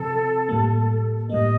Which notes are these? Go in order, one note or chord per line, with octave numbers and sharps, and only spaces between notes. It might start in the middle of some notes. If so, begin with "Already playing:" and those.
Already playing: C3 F3 C4 A4
A2 G3 A#3
A2 G3 A#3 D#5